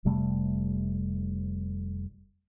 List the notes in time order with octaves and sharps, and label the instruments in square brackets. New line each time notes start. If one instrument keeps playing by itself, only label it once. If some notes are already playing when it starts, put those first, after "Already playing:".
[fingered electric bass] F1 C3 G3 A3